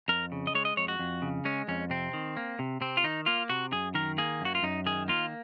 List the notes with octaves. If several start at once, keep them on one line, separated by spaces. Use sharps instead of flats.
F2 A#4
C#3
D#5
G#3 C#5
D#5
F2 C#5
F#4
F2
C#3
G#3 C#4
F2 C#4
C3 C4
D#3
A#3
C3
C3 C4
F4
D#3 D#4
A#3 F4
C3 F#4
F#2 G#4
D#3 A#4
A#3 G#4
F#2 F#4
F4
F#2 D#4
D#3 G#4
A#3 F4